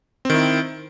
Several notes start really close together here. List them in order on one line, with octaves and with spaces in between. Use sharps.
C4 D#3 E4